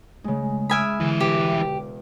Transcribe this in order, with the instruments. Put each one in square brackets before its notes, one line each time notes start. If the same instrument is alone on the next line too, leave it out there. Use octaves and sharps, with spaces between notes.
[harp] C#3 G#3 [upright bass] A3
[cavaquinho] E5 G#5 B5 [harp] D#6 F6 D7
[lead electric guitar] C2 E3 [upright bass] D3
[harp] E1 [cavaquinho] G4